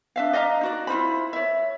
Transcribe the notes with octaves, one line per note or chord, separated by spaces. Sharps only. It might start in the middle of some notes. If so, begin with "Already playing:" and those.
D4 E5 F5
D5 D#5 F5 A#5
D#4 F#4 D5
E4 F4 C5 B5
C#5 E5